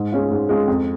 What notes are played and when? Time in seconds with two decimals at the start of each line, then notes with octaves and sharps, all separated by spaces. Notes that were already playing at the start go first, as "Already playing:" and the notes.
Already playing: G#2
0.12 G#3 C#4 F4
0.31 G#2
0.49 G#3 C#4 F4
0.68 F2